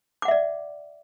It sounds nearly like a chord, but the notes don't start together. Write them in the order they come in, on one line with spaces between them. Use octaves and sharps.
D6 F#5 E5 D5